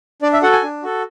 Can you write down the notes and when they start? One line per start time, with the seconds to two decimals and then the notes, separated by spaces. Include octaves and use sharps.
0.22 D4 D5
0.33 E5
0.42 F#4 A4 F#5
0.52 G#5
0.63 D4
0.83 F#4 A4